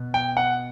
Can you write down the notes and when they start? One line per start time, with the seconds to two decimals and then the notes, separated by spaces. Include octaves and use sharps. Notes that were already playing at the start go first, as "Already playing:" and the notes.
Already playing: B2 B3
0.14 G5
0.37 F#5